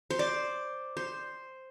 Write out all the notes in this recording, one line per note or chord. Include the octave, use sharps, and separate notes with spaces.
C5
D5
C5